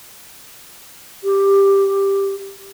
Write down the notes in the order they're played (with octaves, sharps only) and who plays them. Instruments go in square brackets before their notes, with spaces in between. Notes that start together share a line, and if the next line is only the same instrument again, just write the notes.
[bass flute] G4